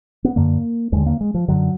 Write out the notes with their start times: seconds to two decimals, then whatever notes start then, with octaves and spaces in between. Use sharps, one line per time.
0.24 B3
0.36 F#2 D3 A#3
0.92 D#2 D3 G#3
1.06 A#3
1.21 G#3
1.34 F3
1.48 F#2 D3 F#3